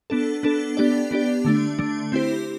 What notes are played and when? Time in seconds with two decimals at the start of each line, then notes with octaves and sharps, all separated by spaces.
0.10 B3 D4 A4
0.43 B3 D4 A4
0.77 B3 D4 G4 D5
1.11 B3 D4 G4 D5
1.45 D3 A3 D4
1.79 D3 A3 D4
2.12 C4 E4 G4 C5